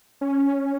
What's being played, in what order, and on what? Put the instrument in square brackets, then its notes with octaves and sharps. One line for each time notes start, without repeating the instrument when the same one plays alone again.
[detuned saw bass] C#4